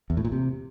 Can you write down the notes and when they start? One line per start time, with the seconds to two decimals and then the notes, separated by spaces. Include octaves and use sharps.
0.10 E2
0.17 A2
0.25 A#2
0.32 C3